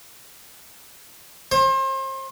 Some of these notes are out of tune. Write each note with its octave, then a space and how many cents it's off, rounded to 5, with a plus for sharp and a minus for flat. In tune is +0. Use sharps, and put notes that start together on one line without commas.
C5 +35